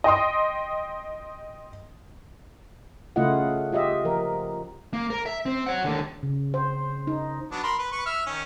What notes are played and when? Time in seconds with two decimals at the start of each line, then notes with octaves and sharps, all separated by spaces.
0.04 D#5 G5 C6 D#6
3.16 C#3 A3 E4 F4 D#5 F#5
3.72 F4 G4 D#5 E5
4.05 F3 A#4
4.93 A#3
5.10 A#4
5.26 E5
5.46 C4
5.66 C#5 F#5
5.83 D#2 D3
6.23 C#3
6.54 C5
7.07 D#4
7.51 F#3 B3 D4
7.63 A#4 B5 C6
7.79 B4
7.92 B4 C#6
8.06 E5 F6
8.26 D#3 C#4